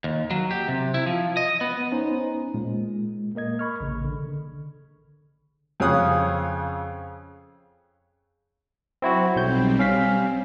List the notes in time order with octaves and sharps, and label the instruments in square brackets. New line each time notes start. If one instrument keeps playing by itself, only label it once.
[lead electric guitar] D#2
F#3
G4
C3
E4
F3
D#5
B3
[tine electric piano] B3 C#4 D#4 C5
A#2 G#3
A#3 A#4 D#5 G#6
B5 C#6 F6
A1 C#3
D3
[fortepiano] F2 C#3 C#5 F5 D#6 F#6
[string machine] F#3 [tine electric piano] C4 E4 F#4
[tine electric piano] B1 G6 [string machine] G3 C4
[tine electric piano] C#4 F5 B6